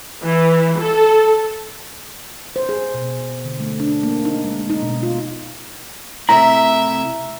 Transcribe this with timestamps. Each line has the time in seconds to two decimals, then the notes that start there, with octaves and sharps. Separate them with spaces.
0.23 E3
0.79 A4
2.56 C5
2.69 G#4
2.94 B2
3.45 D3
3.60 A3
3.80 D4
4.03 A#3
4.25 D#4
4.44 G#3
4.70 D#4
4.82 B2
5.03 F4
6.29 C3 A3 E4 E5 A#5